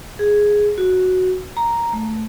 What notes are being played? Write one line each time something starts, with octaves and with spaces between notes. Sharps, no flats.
G#4
F#4
A#5
A3